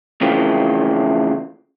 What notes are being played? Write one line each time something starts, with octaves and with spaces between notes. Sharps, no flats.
C#3 E3 F3 A3 A#3 C4